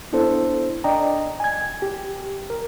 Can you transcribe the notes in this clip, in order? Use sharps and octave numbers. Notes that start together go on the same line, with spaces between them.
B3 D4 E4 A4 C5
D4 D5 D#5 G5 A#5
G#5 G#6
G4
A#4